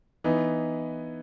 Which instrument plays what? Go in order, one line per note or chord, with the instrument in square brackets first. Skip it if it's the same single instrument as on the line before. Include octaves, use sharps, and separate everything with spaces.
[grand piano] E3 B3 D#4